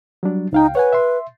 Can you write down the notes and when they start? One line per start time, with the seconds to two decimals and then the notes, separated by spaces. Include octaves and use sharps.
0.23 F#3 G3 D4
0.53 C#2 D#4 F5 G5
0.75 B4 C#5 F#5 G#5
0.92 E5 C6